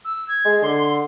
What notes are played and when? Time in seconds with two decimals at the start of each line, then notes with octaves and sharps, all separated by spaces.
0.05 E6
0.28 G#6
0.45 G#3
0.62 D3 C6